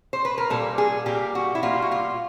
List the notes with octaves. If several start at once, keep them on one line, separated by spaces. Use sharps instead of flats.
C5
B4
A#4
A#2 G3 A#3 A4
G#4
A#2 G3 A#3 G4
F#4
E4
A#2 G3 A#3 F4
F#4
F4